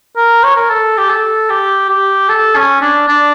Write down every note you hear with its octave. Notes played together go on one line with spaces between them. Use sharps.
A#4
C#5
A#4
A4
G4
A4
G4
G4
A4
C#4
D4
D4